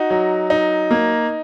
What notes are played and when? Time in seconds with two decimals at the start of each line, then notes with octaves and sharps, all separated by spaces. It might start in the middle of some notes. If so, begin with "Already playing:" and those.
Already playing: D#4 F#4
0.10 F#3
0.50 D#4
0.91 A#3